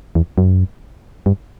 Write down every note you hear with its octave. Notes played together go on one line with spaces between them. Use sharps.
E2
F#2
G2